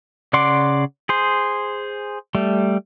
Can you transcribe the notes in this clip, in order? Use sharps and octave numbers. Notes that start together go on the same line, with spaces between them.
C#3 D5 F#5 C6 D6
G#4 C5
G3 A3